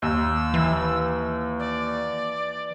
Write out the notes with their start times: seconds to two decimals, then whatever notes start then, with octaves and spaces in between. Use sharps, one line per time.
0.02 D#2 E6
0.54 E3
1.59 D5